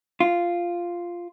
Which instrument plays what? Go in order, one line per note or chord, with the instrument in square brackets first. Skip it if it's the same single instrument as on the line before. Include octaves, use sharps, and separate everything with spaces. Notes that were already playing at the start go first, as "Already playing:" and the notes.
[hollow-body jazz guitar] F4